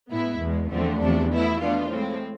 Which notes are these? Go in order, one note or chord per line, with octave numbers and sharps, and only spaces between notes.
A2 G#3 B3 E4
E2 B2 G#3
E2 D3 F3 A3 C4
E2 C3 F3 A3 D4
B2 A3 E4
B2 A3 D4 F4
A2 G#3 C4